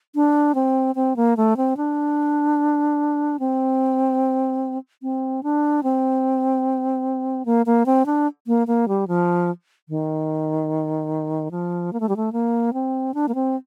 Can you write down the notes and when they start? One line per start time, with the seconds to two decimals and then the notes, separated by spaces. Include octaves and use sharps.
0.15 D4
0.55 C4
0.95 C4
1.16 A#3
1.37 A3
1.57 C4
1.77 D4
3.40 C4
5.02 C4
5.43 D4
5.83 C4
7.46 A#3
7.66 A#3
7.86 C4
8.06 D4
8.47 A#3
8.67 A#3
8.88 G3
9.08 F3
9.89 D#3
11.51 F3
11.93 A#3
12.00 A3
12.09 G3
12.16 A3
12.33 A#3
12.73 C4
13.14 D4
13.28 A#3
13.35 C4